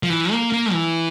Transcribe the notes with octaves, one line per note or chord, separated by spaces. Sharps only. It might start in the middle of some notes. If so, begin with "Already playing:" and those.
F3
E3
A#3
A#3
E3